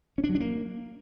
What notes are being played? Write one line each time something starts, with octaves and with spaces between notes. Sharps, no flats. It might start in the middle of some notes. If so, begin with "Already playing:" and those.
C#4
D4
F#3
D4
A#3